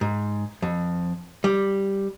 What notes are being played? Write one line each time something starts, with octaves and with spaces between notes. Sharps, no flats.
G#2
F2
G3